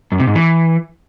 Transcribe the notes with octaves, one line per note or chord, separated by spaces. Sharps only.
F#2
C3
G#2
E3